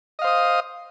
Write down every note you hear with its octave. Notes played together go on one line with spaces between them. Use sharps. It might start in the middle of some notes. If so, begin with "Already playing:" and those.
C5 D#5 F5 D#6